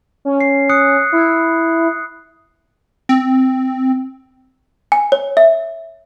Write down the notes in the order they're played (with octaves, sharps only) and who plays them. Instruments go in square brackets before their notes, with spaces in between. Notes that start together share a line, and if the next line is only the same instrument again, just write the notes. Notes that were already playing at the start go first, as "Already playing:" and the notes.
[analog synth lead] C#4
[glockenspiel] C7
D#6 F#6 C#7
[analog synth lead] E4
[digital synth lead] C4
[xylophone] G#5
C#5
E5